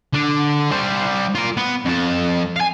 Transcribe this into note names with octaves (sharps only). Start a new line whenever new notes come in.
D3 D4
G3 C5
F4 A#4
B3
F2 A4
F5 G#5